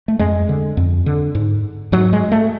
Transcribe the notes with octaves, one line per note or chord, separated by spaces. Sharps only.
A3
F2 G#3
D3
F2
D3
G#2
G#2 F#3
G#3
A3